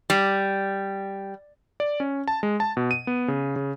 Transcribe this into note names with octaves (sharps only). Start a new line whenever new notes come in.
G3
D5
C#4
A5
G#3
A5
B2
D#7
B3
C#3
C#3